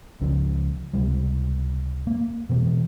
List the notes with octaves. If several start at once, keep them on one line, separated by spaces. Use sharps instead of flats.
C#2 C#3 F3
C#2 C3 G3
A#3
B2 E3 B3